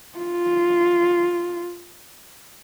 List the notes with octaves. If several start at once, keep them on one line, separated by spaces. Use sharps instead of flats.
F4